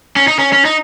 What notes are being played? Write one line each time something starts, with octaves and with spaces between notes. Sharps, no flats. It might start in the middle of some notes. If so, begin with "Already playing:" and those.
C#4
D#4
C#4
C#4
D#4